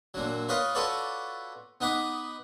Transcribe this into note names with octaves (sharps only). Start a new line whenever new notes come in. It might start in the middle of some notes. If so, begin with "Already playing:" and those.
A#2 D3 F#3
F4 B4 C#5 D#5 F5
F4 F#4 A4 B4 C#5 D5
B3 D#4 F#5 B5 D6